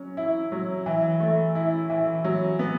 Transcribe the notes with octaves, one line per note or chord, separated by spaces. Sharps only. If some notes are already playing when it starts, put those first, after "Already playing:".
Already playing: F#3 C#4
E4
F#3
E3
A3
E4
E3
F#3
B3